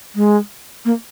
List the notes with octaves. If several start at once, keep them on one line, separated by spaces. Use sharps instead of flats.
G#3
A#3